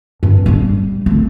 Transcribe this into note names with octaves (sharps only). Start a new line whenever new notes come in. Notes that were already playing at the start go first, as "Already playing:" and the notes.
G2
G3 D4
A3 C4